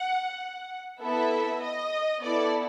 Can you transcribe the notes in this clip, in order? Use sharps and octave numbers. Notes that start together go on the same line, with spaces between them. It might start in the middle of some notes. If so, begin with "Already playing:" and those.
Already playing: F#5
B3 E4 A4 E5
D#5
B3 E4 A4 D5